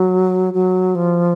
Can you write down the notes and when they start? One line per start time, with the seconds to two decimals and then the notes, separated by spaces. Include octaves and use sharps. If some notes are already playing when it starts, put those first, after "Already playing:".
Already playing: F#3
0.54 F#3
0.95 F3